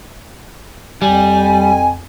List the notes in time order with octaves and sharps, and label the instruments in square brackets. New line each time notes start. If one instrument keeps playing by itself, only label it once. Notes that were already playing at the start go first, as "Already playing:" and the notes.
[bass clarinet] F2 [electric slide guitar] G3 [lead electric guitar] G#5